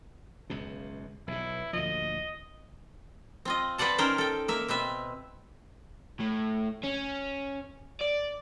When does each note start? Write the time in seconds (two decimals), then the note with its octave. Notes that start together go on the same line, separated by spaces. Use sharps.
0.50 C#2 F#2 B2
1.28 B1 B2 E4
1.73 D2 A#2 F3 D#5
3.45 C4 F4 D#5
3.78 B4 C5 D5 F#5 A5
3.98 C#4 D#4 A#4 C5 G5
4.18 A4 G5
4.48 A#3 E5
4.68 B2 C4 B4 E5
6.20 A2
6.83 C#4
8.01 D5